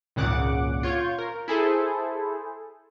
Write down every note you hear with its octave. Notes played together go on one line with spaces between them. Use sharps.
G#1 C#2 A#2 C#3 F#5 D6
F4 C#5 C#6 G6 G#6
A#4
E4 G#4 A4 C5